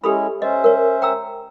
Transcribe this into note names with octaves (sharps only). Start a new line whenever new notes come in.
G#3 C#4 E4 G4 A4 B5
C#4 C5 D#5 E5
A#4 C#5
G5 A#5 E6